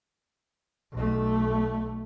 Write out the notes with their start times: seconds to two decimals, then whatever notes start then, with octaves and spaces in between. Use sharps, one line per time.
0.92 B1 A3